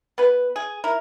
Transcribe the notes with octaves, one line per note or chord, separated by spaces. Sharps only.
B3 B4
G#4
E4 A#4